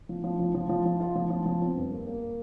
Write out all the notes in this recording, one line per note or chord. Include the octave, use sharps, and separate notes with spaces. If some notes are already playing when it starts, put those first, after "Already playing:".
F3
F3
F3
F3
F3
F3
F4
F3
F3
F3
C4
G2
A#3
A#3